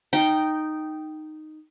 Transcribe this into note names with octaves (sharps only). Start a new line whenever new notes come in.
D#4 G5